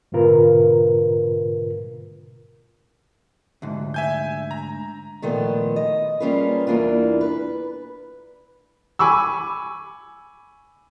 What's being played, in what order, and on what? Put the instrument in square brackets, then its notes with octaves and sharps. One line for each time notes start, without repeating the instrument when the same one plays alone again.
[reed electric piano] G#2 B2 D3 F4 A#4 B4
[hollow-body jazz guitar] D2 G#2
[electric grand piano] E5 G#5 G6
A#5
[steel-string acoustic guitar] A#2 D#3 F3 A3 B3
D#5
G3 A#3 C#4 F4 G#4 B4
E2 E3 A#3 D4 F4
B4
[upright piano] G#5 B5 C#6 D6 E6